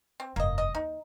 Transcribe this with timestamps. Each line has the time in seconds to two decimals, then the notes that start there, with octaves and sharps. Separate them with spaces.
0.20 C4
0.36 F1 G2 A#3 D#5
0.58 D#5
0.75 D#2 D#4